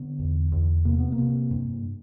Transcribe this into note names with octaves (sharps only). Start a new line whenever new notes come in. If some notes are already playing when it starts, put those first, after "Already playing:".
Already playing: D3 B3
E2
E2
C3 A#3
B3
A#3
C3
G2